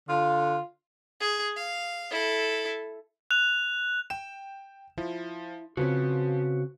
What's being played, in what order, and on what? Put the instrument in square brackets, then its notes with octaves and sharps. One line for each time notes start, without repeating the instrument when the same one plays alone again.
[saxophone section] D3 F4
[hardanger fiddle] G#4
F5
E4 A4
[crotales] F#6 F7
[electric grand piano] G5 E7
[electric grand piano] F3 [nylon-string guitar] E4
[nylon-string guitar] C#3 C4 [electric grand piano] F3 [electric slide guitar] F#4 B4 C#5